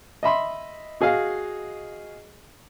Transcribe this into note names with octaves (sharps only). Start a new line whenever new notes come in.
D#5 E5 B5 C6
F#4 G#4 D#5 F5